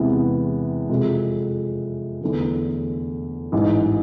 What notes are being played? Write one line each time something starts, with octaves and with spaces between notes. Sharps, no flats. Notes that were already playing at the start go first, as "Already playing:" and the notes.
Already playing: E2 C3 E3 G#3 B3
F2 C3 G#3
E2 D3 A3
A1 G#2 E3